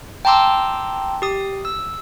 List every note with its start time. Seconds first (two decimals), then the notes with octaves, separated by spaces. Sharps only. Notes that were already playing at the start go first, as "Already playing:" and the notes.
0.25 G5 A5 A#5 C6 D6 E6
1.22 G4 D#6
1.65 E6